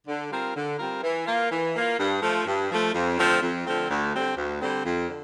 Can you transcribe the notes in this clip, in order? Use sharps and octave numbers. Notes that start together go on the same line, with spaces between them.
D3
G3 C4 F4 A#4
D3
G3 C4 F4 A#4
E3
A#3 F4
E3
A#3 F4
G2
F3 A3
G2
F3 A3
F2
D3 F3 A3 C4
F2
D3 F3 A3 C4
D2
D3 G3 C4
D2
D3 G3 C4
F2
D3